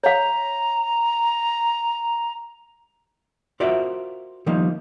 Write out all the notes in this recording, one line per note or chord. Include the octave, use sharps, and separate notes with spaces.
C#5 F5 A#5
F4 F#4 A#4 C5 D5 E5
D#3 F3 G3 A#3 D#4